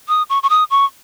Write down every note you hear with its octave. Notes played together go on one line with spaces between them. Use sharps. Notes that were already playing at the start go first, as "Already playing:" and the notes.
D#6
C#6
C#6
D#6
C#6